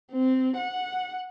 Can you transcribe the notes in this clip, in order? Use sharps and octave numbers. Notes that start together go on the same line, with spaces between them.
C4
F#5